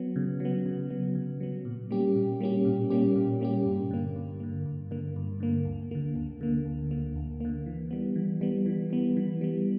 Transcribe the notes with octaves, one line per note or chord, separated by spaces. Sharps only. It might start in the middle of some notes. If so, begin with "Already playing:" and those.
Already playing: F#3 B3
C#3
F#3 B3
C#3
F#3 B3
C#3
F#3 B3
A#2
G3 A#3 C#4 G4
A#2
G3 A#3 C#4 G4
A#2
G3 A#3 C#4 G4
A#2
G3 A#3 C#4 G4
G2
D3 A#3
G2
D3 A#3
G2
D3 A#3
G2
D3 A#3
D2
D3 A#3
D2
D3 A#3
D2
D3 A#3
D2
D3 A#3
E3
G3 B3
E3
G3 B3
E3
G3 B3
E3
G3 B3